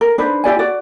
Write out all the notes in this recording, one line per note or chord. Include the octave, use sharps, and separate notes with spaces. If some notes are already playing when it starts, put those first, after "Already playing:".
A#4
D4 D#4 B4 C5
E4 G4 D5 G#5
F#4 D5